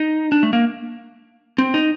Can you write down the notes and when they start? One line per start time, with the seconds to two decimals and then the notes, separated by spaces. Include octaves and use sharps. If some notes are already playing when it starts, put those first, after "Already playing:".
Already playing: D#4
0.32 D4
0.43 A3
0.53 A#3
1.58 C4
1.74 D#4